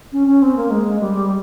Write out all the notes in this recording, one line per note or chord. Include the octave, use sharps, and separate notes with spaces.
C#4
C#4
C4
A#3
G#3
G3